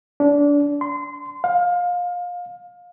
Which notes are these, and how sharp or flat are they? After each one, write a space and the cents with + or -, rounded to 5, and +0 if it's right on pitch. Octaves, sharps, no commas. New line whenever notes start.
D4 -25
C6 -25
F5 +25